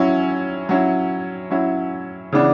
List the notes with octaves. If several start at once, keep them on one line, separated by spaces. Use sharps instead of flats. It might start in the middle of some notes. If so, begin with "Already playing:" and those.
Already playing: F#3 C#4 E4
F#3 C#4 E4
F#3 C#4 E4
C#3 E3 B3 D4